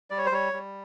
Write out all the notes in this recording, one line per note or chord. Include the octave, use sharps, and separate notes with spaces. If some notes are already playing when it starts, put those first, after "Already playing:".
G3 D5
C#5
C5
G3 C#5
G3